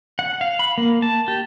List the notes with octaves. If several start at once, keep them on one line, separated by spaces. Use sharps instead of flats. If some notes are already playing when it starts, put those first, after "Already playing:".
F#5
F5
B5
A#3
A5
G4